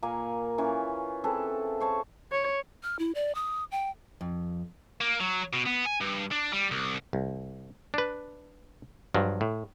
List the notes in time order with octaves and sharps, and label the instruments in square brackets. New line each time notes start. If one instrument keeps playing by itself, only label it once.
[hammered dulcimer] A#2 A#3 G#5 A#5
E3 C#4 F4 B4
C4 G#4 A4 B4
C5 C#5 A5
[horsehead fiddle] C#5
[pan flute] F6
E4
D5
D#6
G5
[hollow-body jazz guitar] F2
[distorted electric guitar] A#3
F#3
B2
B3
G#5
G2
D4
G3
C2
[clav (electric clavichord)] C2
D4 B4
G2 F3 F#3
A2